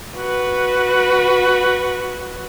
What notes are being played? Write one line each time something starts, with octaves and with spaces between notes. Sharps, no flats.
F#4 B4